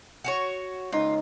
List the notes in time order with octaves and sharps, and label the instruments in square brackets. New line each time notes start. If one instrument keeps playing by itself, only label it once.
[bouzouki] F#4 G4 C#5
[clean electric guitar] C#2 D#4 [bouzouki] F4